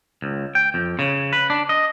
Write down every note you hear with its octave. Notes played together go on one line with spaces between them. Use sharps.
C#2
G5
F2
C#3
B4
D4
D#5